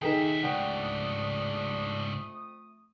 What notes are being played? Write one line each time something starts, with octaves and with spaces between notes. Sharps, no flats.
D#2 D#4 G#4 A4 E5 G5
F2 G#2 C#3 A3 D4 F#5 G5 D#6